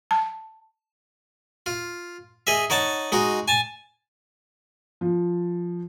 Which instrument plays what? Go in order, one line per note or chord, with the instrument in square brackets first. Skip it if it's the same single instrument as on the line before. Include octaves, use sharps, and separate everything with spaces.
[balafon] A5
[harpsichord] F4
G#4 D#5 E5
D#4 C#5 F#5 A5
G#3 D#4 F#4
G#5 A5
[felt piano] F3